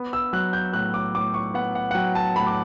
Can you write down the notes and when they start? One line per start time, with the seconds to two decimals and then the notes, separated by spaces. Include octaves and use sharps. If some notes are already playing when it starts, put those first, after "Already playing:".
Already playing: B3
0.13 E6
0.33 F#3 F#6
0.53 G6
0.73 A2 F#6
0.94 D6
1.14 A2 D6
1.34 C#6
1.54 B3 F#5
1.75 F#5
1.91 F#5
1.95 F#3 G5
2.15 A5
2.36 A2 B5
2.47 D6